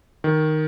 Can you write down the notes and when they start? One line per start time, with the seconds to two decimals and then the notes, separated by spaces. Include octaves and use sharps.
0.24 D#3